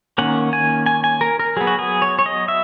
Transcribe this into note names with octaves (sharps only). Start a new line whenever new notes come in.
D#3 A#3 C#4 F#5
G#5
G#5
G#5
A#4
A#4
F#3 B3 G#4
F#4
G#4
C#5
C#5
D#5
E5